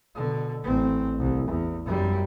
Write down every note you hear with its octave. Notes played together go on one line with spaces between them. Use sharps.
B2 D3
A1 C4
C2
E2
F#2 G3